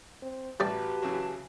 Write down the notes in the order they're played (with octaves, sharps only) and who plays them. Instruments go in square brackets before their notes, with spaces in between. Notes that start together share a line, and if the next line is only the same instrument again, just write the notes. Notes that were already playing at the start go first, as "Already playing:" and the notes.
[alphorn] C4
[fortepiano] A1 [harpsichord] G3 D5 [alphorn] F#4 [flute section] G4 B4 A5
[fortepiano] C#3 E3 F#3